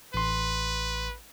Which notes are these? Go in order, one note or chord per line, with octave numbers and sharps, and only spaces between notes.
A1 B4 C6